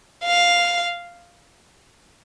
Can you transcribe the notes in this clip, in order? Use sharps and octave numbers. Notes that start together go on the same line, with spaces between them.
F5